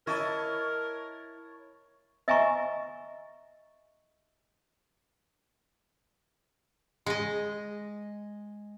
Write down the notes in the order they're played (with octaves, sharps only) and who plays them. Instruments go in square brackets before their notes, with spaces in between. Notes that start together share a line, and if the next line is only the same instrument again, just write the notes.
[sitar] E4 D#5 [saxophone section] A#4 [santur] C#5 A5
[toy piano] D#5 E5 G#5 A#5 C#6
[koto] G#3 D#5